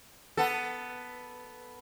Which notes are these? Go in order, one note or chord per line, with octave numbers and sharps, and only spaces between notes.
B3 A4